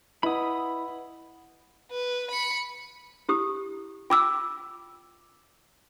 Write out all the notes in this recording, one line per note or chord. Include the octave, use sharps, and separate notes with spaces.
E4 B4 D#5 F#5 B5 D#6
B4
B5 C#7
E4 G4 D#6
F4 G5 D6 E6